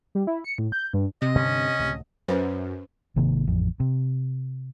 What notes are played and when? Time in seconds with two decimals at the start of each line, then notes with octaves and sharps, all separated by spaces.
0.15 G3
0.27 E4
0.44 C#7
0.58 A2
0.72 G6
0.93 G2
1.22 C3 D#5
1.35 G2 D3 C#4 D4
1.79 C#2 A2 D3
2.28 F#2 C#4 B4 C5
3.16 G#1 C3 D#3 A#3
3.47 A1 F2
3.80 C3